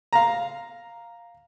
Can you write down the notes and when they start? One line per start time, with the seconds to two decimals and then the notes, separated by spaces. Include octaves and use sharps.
0.13 F5 A#5